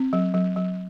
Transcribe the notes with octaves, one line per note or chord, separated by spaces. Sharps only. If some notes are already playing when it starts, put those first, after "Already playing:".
Already playing: C4
F#3
F#3
F#3